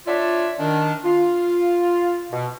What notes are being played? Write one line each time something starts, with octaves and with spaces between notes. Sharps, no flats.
D4 F4 C#5 D5 E5
D#3 D4
F4
B2